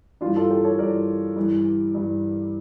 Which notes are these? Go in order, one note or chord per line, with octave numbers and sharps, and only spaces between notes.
G2 E3 D4 F4
F4 A4
G4 A#4
A4 C#5
G2 E3 A#4 D5
G2 E3
G2 E3